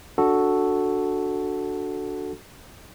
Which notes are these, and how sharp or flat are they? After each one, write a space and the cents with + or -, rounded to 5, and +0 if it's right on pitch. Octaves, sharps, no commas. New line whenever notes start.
D4 +0 F#4 +0 A4 +0